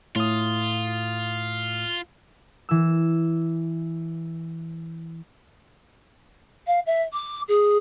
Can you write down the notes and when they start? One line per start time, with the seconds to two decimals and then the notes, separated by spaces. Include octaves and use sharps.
0.16 A2 F4 D#6
2.69 E3 E6
6.67 F5
6.86 E5
7.12 D6
7.48 G#4